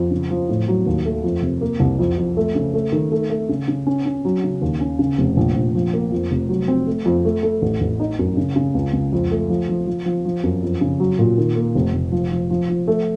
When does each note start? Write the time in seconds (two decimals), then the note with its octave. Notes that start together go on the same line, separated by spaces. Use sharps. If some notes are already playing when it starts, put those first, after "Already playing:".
Already playing: F2
0.11 C#3
0.30 F3
0.49 A2
0.68 F#3
0.86 D#2
1.06 A3
1.24 F2
1.42 C3
1.61 A#3
1.80 C2
1.99 F2
2.18 F2
2.37 A3
2.55 C#3
2.74 A3
2.92 D#3
3.12 A3
3.30 A3
3.49 C#3
3.68 C#3
3.87 C#4
4.06 C#4
4.25 F#3
4.44 C#3
4.62 D#2
4.81 C#4
4.99 C#3
5.18 F1
5.37 A#1
5.55 A#1
5.75 F3
5.94 A#3
6.12 F2
6.31 F1
6.49 F#3
6.68 C4
6.87 A3
7.05 F2
7.25 A3
7.43 A3
7.62 A1
7.81 A1
8.00 D#4
8.19 F#2
8.37 C#3
8.56 C#3
8.74 C#2
8.93 C#2
9.12 F2
9.31 A3
9.50 F3
9.69 F3
9.87 F3
10.05 F3
10.25 F3
10.44 F#2
10.63 F2
10.81 C#3
11.00 F#3
11.19 A#2
11.38 D#3
11.56 A#3
11.75 F1
11.94 F1
12.12 F3
12.31 F3
12.50 F3
12.69 F3
12.88 A3